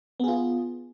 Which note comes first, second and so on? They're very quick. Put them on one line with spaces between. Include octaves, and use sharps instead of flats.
B3 G#4 F4